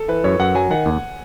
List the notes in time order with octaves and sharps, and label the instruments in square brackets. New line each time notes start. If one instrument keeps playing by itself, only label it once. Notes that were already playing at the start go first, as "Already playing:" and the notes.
Already playing: [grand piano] A4
[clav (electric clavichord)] E3 [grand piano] B4
[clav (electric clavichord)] F#2 [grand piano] C#5
[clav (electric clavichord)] F#2 [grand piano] F#5
[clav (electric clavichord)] F#3 [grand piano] G#5
[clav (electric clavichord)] D#3 [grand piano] F#5
[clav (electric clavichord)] D#2